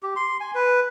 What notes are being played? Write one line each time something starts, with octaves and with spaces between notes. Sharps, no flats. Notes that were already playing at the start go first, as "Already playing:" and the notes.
G4
C6
G#5
B4